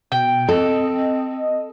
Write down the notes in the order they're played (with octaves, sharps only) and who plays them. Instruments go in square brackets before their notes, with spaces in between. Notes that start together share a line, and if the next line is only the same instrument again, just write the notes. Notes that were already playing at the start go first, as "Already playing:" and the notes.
[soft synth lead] B2 [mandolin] G5
[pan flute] C4 [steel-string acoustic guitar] A4 [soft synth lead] D#5